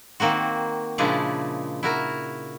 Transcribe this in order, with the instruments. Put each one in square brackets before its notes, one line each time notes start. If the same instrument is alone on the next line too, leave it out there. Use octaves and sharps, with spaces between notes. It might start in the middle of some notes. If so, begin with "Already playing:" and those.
[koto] D#3 A#3 C4 F#4
A#2 C#3 F3 G#3 D4 E4
E4 F#4 A#4